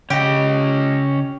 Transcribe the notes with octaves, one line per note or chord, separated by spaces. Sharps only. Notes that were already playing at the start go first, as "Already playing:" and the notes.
C#3 C#4 G4 D#5